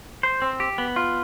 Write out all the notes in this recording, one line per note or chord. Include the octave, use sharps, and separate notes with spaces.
C5
C4
G4
B3
F4